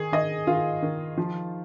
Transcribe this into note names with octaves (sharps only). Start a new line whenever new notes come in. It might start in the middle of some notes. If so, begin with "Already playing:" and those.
Already playing: D#3 G#4
D#3 D#5
D#3 F4
D#3
F3